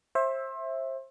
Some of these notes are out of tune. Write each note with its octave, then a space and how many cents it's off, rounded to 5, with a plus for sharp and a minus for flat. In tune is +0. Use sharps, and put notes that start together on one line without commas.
C5 +30 E5 +0